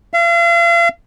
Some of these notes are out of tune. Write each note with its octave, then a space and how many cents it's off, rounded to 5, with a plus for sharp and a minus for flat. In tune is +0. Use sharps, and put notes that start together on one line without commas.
F5 -40